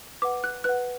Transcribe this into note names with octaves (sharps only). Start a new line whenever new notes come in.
B4 F#5 D6
F#6
B4 F#5 F#6